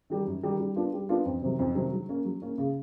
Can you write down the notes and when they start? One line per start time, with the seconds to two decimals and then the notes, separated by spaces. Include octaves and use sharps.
0.10 D#3 G3
0.26 F#2
0.43 D#3 G3
0.60 G3
0.76 B3 D4 F4
0.93 G3
1.09 B3 D4 F4
1.25 F2
1.42 C3 D#3 F#3
1.59 F2
1.75 C3 D#3 F#3
1.93 F#3
2.09 A#3 C#4
2.25 F#3
2.42 A#3 C#4
2.58 C#3